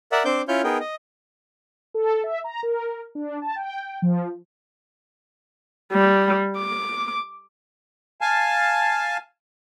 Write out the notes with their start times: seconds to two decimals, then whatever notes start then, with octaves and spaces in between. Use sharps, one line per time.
0.12 A#4 D5 E5 F#5
0.25 C4 D4 C5 D6 G6
0.48 C#4 E4 F4 C#5 F6 G6
0.64 B3 D#4 G#4 A#4 G5
0.80 D#5
1.94 A4
2.24 E5
2.44 A#5
2.63 A#4
3.15 D4
3.42 A5
3.56 G5
4.02 F3
5.93 G3
6.58 D6
8.21 F5 G#5 A5